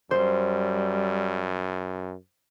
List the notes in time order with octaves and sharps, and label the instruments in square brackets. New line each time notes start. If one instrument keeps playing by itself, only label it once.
[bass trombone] F#2 [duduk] G3 [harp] C5